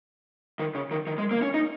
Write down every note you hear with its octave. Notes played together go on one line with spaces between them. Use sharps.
D#3
C#3
D#3
D#3
G#3
A#3
C#4
D#4